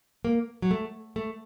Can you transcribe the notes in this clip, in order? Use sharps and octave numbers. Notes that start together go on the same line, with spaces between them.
A#3
F#3
A3
A3